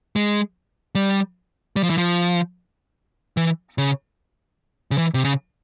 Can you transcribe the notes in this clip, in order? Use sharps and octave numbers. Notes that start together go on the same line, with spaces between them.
G#3
G3
G3
F3
E3
F3
E3
C#3
C#3
E3
C3
C#3